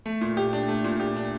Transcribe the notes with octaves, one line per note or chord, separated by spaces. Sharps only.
A3
A#2
G4
D4
A3
A#2
G4
D4